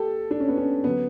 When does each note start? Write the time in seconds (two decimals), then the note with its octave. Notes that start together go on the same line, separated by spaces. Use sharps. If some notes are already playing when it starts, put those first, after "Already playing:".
Already playing: G4 A4
0.31 D4
0.40 C#4
0.48 B3
0.58 C#4
0.84 D3 F#3 B3